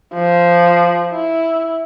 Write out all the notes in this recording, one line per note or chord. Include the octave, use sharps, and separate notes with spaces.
F3
E4